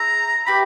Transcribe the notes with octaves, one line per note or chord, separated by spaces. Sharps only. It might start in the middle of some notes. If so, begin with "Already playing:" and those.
Already playing: E4 G#4 C5 E5 A#5
E4 G4 B4 B5